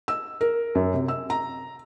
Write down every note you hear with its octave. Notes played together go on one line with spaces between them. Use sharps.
E6
A#4
F#2
C3
E6
A#5